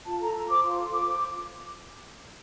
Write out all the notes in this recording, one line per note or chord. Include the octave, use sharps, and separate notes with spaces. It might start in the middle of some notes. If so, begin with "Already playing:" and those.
F4 A5
A4 A#5
F4 A#5
C5 D6
F4 C6
A4
F4 D6
C5
D6